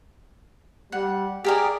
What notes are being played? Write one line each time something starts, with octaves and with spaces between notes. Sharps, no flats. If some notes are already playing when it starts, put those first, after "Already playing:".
G3 F#5
G4 G#4 A#4 D5